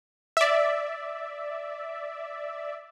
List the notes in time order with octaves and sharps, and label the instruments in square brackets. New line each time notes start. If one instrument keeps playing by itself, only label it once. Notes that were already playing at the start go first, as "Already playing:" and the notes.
[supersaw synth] D5 E5